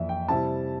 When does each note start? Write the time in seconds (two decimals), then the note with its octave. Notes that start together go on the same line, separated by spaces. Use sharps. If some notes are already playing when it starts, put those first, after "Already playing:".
Already playing: F2 E3 A#3 D5 E5
0.09 G5
0.28 C3 G3 C4 E4 A5